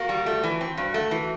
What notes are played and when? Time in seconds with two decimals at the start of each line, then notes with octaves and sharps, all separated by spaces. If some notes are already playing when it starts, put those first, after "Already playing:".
Already playing: A#3 F#4
0.09 G3
0.26 A3
0.43 E3
0.61 C4
0.77 G2 F#4
0.94 A3
1.11 E3